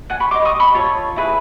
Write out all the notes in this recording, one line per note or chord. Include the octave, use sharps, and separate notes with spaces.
F#5 G#5
B5 C#6
G4 C5 D#5 C6 D6
C#6 D#6
B5 C#6
F4 A4 C#5
E4 G#4 B4